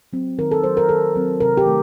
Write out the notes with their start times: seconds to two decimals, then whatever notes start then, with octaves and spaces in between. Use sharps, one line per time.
0.13 F#3 C4
0.38 D#3 A#4
0.51 A4
0.64 F#3 C4 C5
0.77 A#4
0.89 D#3 A4
1.15 F#3 C4
1.40 C3 A#4
1.57 G4
1.66 D#3 A3